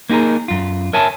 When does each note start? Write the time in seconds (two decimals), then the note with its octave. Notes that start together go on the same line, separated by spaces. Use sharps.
0.10 A#3 D#4 F#4 G#4 A#4
0.48 F#2 F4
0.93 A#4 C#5 E5 G#5 A5